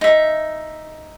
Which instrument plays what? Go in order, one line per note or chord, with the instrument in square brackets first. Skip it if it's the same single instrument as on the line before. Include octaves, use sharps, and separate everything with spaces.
[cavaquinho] D#4 E5